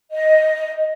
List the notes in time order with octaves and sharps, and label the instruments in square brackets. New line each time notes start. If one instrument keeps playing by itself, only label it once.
[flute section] D#5